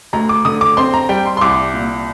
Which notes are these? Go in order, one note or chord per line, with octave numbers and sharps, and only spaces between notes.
D2 A#5
D6
D3 D#6
D6
C4 C6
A#5
G3 G5
C6
C6
C2 D6
A#2